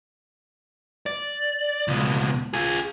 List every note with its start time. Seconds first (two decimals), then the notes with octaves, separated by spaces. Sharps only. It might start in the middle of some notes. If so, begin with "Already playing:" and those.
1.06 D5
1.88 C#2 B2
2.54 F4 G#4